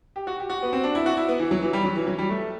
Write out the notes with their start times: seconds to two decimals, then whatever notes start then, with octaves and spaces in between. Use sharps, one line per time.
0.16 G4
0.27 F#4
0.40 G4
0.50 F#4
0.62 B3
0.73 C4
0.83 D4
0.95 E4
1.06 F#4
1.17 E4
1.28 B3
1.40 E3
1.51 F#3
1.62 E3
1.73 G3
1.85 F#3
1.96 E3
2.07 F#3
2.18 G3
2.30 A3